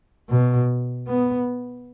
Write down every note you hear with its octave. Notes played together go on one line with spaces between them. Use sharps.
B2
B3